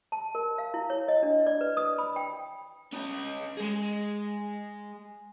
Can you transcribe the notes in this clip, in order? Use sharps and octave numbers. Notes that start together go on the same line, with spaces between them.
A5
A#4
F5
E4
C#5
D#5
D4
D5
B4
D#6
B5
G5
C#4 D#5
G#3 G#4